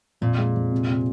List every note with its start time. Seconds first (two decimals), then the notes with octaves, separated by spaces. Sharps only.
0.21 F2 A#2
0.38 G#3
0.56 F2
0.72 C3
0.89 C3